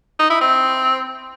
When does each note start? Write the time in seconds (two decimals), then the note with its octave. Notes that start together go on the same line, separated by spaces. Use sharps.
0.19 D#4
0.30 E4
0.41 C4